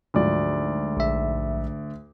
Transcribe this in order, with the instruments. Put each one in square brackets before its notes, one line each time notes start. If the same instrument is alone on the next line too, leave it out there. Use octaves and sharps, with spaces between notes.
[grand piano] D2 D5 [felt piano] G#2 F3 F#3
[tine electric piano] A#1 E5